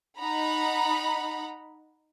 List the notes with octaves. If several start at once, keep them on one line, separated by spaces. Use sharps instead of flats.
D#4 F#5 A#5 B5